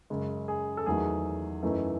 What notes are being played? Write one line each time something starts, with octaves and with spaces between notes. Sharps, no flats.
F#2 C#3 G#3
G#4
A4
E2 D#3 F#3 A3 G#4
F#2 E3 A3 D#4